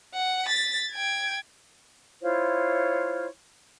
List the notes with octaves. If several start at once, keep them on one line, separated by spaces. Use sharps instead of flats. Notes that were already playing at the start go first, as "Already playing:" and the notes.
F#5
A6 B6
G5 G#6
E4 F4 C5 C#5